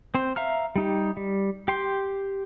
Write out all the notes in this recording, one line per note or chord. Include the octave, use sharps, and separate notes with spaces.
C4 C5
E5 F5 A#5 F6
G3 D#4 G4
G3
G4 G5 C6